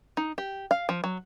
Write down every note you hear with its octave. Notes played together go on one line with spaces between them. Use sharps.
D#4
G4
F5
F3
F#3